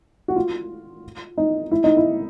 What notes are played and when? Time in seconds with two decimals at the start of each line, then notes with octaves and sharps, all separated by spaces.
0.28 F#4
0.36 F4
1.38 D#4
1.71 E4
1.84 D#4
1.97 E4